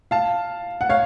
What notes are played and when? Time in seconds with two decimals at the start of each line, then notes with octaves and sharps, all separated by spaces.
0.11 F5 A5
0.81 F#5
0.89 C#5 F5